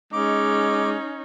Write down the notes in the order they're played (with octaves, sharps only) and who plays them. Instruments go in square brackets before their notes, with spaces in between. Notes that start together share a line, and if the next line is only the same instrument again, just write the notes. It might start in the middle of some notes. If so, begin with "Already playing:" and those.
[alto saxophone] G#3 [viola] C#4 D#4 [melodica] D6